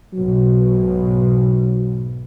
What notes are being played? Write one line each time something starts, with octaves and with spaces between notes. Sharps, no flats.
B1 G#2 B2 F#3